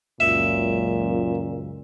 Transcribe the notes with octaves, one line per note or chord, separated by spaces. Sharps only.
C#2 F#2 A#2 E5